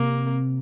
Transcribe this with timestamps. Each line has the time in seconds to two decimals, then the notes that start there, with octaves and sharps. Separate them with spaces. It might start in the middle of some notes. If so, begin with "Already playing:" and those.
Already playing: C3 A#3